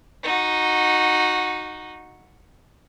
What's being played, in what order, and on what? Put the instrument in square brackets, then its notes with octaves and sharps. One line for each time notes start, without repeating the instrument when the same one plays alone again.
[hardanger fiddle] D#4 F#4